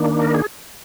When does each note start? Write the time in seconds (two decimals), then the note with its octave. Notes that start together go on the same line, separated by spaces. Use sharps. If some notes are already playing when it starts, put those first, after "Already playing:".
Already playing: D#3 A#3 D4
0.22 A#4
0.34 G#4